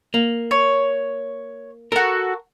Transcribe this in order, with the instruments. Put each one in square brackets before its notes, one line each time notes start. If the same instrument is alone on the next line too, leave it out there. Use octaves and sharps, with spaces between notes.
[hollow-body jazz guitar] A#3
[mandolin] C#5
[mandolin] F#4 A4 [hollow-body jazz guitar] A#4